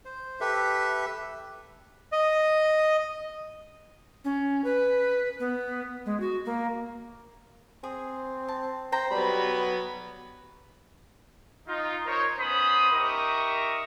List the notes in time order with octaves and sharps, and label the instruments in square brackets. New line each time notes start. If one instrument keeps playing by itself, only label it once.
[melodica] C5
G4 A4 B4 E5
[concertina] D#5
[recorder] C#4
B4
B3
G#3
F#4
A#3
[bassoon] C4 [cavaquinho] G#4
[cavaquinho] A5
[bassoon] C5 [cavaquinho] G5 A#5
[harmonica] F#3 B3 B5 [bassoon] G3
[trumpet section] D#4 F4
D#4 A#4 C5 C#5
B3 C#4 C5 B5 D#6
D#4 G4 A#4 E5 C#6 D#6